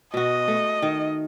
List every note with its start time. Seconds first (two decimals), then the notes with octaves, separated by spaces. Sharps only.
0.14 B2 F#4 D#5
0.48 A3
0.82 D#3